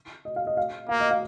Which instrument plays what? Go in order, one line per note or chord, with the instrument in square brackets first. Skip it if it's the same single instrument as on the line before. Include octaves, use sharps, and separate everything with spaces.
[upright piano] D#5
F5
D#5
F5
[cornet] A#3 [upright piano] F5
[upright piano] D#5
F5